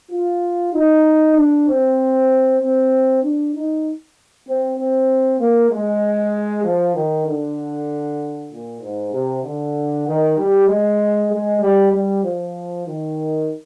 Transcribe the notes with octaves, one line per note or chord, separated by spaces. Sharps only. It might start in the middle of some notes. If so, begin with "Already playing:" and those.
F4
D#4
D4
C4
C4
D4
D#4
C4
C4
A#3
G#3
F3
D#3
D3
A#2
G#2
C3
D3
D#3
G3
G#3
G#3
G3
G3
F3
D#3